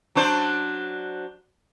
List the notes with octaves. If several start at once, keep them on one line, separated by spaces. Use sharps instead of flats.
F#3 D4 C5